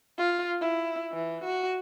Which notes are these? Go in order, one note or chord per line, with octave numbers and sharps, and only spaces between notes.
F4
E4
E3
F#4